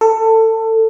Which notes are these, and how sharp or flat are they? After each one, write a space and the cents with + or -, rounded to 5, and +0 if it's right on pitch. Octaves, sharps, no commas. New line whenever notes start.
A4 +20